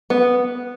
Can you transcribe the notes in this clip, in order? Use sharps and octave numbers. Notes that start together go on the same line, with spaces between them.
B3